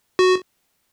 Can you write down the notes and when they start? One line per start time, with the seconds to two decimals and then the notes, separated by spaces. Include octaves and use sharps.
0.19 F#4